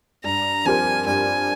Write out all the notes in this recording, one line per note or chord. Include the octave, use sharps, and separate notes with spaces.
G2 A#5
F3 C4 G4 A#4 G#5
G2 G#5